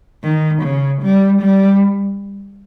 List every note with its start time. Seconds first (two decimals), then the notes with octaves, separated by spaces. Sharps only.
0.23 D#3
0.63 C#3
1.02 G3
1.41 G3